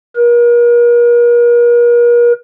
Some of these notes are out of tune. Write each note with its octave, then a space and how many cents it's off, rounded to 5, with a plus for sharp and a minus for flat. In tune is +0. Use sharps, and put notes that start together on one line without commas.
A#4 +40